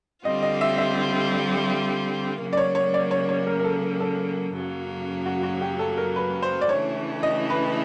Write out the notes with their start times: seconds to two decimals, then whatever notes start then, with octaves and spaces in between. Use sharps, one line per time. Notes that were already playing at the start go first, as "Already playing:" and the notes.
0.25 D3 G3 C4 F4 D#5
0.43 D#5
0.61 E5
0.78 E5
2.39 C#3 F#3 A#3
2.53 D5
2.57 C#5
2.75 C#5
2.94 D5
3.11 C#5
3.29 C#5
3.47 A#4
3.59 A#4
3.64 A4
4.00 A4
4.55 F#2 C#3 F#3 A#3
5.26 F#4
5.43 F#4
5.61 G4
5.79 A4
5.98 A#4
6.16 B4
6.42 C5
6.61 D5
6.69 C#3 E3 A3 D4 C#5
7.23 D#5
7.50 B4